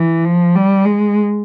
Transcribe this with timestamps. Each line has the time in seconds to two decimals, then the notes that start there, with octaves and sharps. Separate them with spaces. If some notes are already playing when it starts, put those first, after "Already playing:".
Already playing: E3
0.25 F3
0.55 G3
0.85 G#3